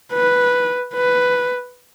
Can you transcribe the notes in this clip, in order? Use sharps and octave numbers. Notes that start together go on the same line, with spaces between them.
B4
B4